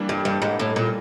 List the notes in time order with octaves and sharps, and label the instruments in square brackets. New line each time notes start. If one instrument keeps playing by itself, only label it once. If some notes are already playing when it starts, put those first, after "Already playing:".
Already playing: [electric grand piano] E3 G3 A#3 D4
[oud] G2
G2
G#2
A2
A#2